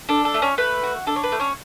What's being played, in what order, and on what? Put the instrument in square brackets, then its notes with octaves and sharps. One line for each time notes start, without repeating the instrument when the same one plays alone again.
[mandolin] D4 A4
A4
A3
C#4 C#5
A3 B4
F#4
D4 A4
C#5
B4
A3
C#4 C#5